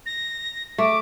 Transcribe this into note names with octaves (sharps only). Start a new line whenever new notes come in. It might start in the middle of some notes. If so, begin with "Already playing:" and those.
A#6
A3 D6